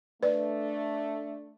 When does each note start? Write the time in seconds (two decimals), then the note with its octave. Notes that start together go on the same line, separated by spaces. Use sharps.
0.23 A3 D4 B4 D5